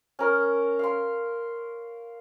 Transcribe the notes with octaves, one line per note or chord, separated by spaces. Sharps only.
C#4 A#4
F5 C6